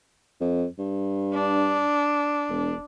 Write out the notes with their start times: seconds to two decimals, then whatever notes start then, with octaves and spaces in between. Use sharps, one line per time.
0.41 F2
0.79 G2
1.34 D4
2.50 E1